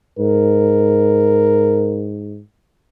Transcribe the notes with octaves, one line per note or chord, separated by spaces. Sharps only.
G#2 A#4